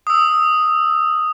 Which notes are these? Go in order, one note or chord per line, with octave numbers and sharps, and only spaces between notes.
D#6 E6